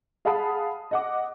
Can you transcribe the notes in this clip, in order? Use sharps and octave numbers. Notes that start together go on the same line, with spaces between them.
G#4 F5 F#5 A5 B5 D#6
D#5 F#5 D6